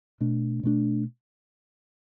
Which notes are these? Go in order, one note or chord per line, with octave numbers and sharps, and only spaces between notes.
B2 A3 D4
B2 A3 D4